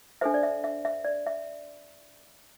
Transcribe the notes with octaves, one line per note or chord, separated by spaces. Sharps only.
D4 A4 C5 E5
D5
E5
E5
E5
D5
E5